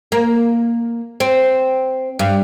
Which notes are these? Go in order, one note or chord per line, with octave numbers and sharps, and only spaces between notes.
A#3
C4
G2